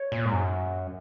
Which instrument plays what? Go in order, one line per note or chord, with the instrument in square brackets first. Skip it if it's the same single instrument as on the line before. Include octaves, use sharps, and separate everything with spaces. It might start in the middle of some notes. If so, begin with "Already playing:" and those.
Already playing: [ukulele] C#5
[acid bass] A#2
G#2
F#2